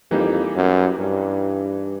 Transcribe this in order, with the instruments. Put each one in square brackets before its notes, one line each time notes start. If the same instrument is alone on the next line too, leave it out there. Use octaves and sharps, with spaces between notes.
[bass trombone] F2 [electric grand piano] E3 G3 A#3 D#4 G4
[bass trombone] F#2
G2